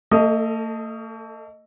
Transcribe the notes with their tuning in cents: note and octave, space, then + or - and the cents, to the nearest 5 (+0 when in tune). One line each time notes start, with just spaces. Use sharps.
A3 +45 A4 +0 D#5 +0